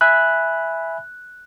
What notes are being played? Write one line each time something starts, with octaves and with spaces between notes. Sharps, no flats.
E5 G#5 B5 F#6